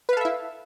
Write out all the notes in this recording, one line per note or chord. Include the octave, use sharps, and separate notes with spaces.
E4 A4 B4 E5 F5